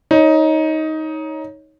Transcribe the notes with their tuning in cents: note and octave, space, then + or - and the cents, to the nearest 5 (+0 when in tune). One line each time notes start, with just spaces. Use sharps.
D#4 +15 C#5 +0